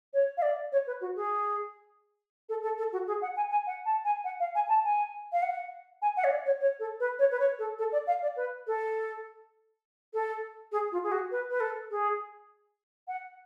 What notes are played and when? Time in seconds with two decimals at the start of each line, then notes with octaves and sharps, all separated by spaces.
0.13 C#5
0.37 F5
0.42 D5
0.72 C#5
0.87 B4
1.01 F#4
1.16 G#4
2.49 A4
2.62 A4
2.77 A4
2.92 F#4
3.07 G#4
3.22 F#5
3.36 G#5
3.51 G#5
3.66 F#5
3.85 A5
4.04 G#5
4.24 F#5
4.40 F5
4.55 G#5
4.69 A5
4.84 G#5
5.32 F5
5.42 F#5
6.02 G#5
6.17 F#5
6.24 C#5
6.30 D5
6.46 C#5
6.60 C#5
6.79 A4
7.00 B4
7.19 C#5
7.31 B4
7.39 C#5
7.58 A4
7.78 A4
7.92 D5
8.07 F5
8.22 D5
8.36 B4
8.67 A4
10.13 A4
10.72 G#4
10.92 F4
11.03 G#4
11.11 F#4
11.31 B4
11.50 B4
11.60 A4
11.90 G#4
13.08 F#5